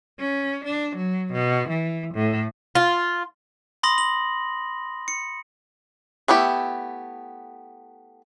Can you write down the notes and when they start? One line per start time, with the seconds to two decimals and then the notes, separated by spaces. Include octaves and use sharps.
0.21 C#4
0.66 D4
0.95 F#3
1.33 B2
1.70 E3
2.14 A2
2.75 F4
3.83 B5 C6 D#6 A#6 F#7
3.98 F#7
5.08 C#7
6.28 A3 B3 E4 G4